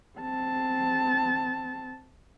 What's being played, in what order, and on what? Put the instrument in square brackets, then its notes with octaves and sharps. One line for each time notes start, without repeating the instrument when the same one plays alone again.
[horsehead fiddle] C4 A5